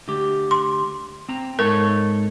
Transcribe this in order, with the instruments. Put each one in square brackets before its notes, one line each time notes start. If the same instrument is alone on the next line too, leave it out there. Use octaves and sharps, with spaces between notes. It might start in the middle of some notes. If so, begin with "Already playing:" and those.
[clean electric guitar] D2 G4
[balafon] C6
[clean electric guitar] C4 A#5
[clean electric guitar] G#2 A4 C#5 [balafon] A#4